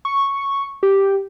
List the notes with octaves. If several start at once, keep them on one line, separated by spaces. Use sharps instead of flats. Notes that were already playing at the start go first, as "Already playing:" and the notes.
C#6
G4